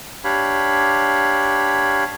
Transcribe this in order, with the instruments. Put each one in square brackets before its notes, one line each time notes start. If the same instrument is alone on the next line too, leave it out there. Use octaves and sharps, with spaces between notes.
[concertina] D4 G4 C#5 F5 B5